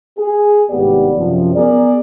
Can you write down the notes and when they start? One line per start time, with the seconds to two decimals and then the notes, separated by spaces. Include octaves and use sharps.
0.18 G#4
0.70 G#1 A2 C3 B3 G4 D5
1.17 F#2 C3 F3
1.56 B3 G#4 A#4 D5